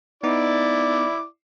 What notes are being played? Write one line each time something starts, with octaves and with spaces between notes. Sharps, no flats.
B3 D#4 E4 D5 D6